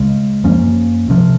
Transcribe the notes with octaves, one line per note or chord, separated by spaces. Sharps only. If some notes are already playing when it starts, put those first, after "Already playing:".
Already playing: C#2 C#3 G#3
F#2 F3 A#3 C#4
C2 C3 F3